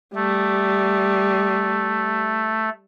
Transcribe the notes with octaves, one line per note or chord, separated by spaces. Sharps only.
G3 A3